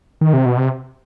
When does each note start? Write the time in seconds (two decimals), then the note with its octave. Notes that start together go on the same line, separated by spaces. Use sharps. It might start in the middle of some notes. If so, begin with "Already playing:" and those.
0.21 D#3
0.33 C3
0.46 B2
0.57 C3